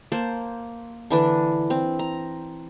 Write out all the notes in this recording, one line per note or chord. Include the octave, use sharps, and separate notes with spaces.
A#3 C5 A5
D3 E3 D4
C4
A#5